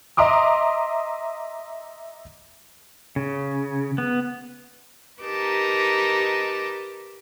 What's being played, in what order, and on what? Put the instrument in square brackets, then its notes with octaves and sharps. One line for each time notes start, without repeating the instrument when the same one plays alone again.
[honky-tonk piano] D#5 E5 A#5 C6 D6 D#6
[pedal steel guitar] C#3
B3
[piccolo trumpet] D#4 [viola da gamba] G4 A#4 B4 [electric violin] A5 D6